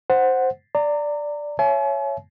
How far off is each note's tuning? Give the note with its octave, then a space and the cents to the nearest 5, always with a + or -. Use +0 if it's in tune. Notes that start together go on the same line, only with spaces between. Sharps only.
C5 +0 F#5 +0
D5 +0 A#5 -30
C#5 +0 E5 +25 G#5 +45